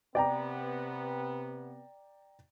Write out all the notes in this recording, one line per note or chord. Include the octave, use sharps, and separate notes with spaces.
C3 B3 D5 G5 A#5